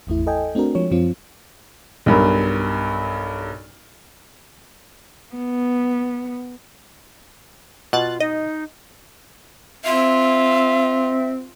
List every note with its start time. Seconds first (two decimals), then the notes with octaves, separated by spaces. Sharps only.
0.07 G#1 E2 A3 E4
0.27 A4 D#5 G5 G#5
0.55 A3 C4 D4 F#4 A#4
0.75 F3 G#3 C#5
0.91 F#2 F3 C4 F4
2.06 B1 G2 A#4
5.35 B3
7.93 B2 F4 F#6 A6
8.20 D#4 D#5
9.84 C4 F4 E5